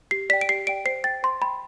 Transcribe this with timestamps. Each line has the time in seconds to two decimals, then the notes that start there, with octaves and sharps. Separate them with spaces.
0.11 G4 C7
0.30 D5 G5 B6
0.41 D7
0.49 G4 C7
0.67 D5 G5 D7
0.85 C5 C7
1.04 G5 A6
1.23 C5 C6
1.42 G5 B5